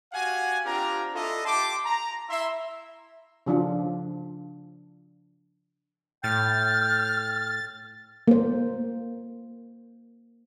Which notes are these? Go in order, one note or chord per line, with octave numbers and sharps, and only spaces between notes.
F#4 G4 F5 F#5 G#5
C4 D4 F4 G4 A#4 A#5
D4 E4 F4 A4 D#5 E5
G4 G5 A5 C6 D6
A#5
E4 E5 C6
C#3 F3 D4 F4
A2 G5 F6 A6
A#3 C5